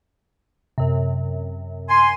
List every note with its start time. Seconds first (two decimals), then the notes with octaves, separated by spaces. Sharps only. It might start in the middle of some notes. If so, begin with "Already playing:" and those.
0.78 F#2 C3
1.89 G#5 C6